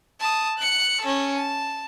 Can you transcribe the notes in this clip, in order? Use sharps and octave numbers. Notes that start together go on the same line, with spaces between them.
A5 D#6
F#6 C#7
C#4 A4
A5